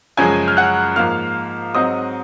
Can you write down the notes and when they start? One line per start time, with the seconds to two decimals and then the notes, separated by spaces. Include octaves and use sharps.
0.17 F#2 C#3 F3 G#3 G#5 G#6
0.48 F6
0.57 F#5 F#6
0.96 G#2 F3 A#3 F5 F6
1.74 G#2 F#3 C4 D#5 D#6